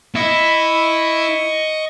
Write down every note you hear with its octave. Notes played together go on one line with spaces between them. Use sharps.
E4 D#5 C#6